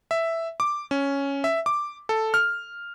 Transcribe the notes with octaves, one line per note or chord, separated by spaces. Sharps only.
E5
D6
C#4
E5
D6
A4
F6